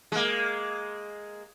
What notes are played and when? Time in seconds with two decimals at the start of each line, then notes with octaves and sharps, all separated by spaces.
0.12 G#3 A#3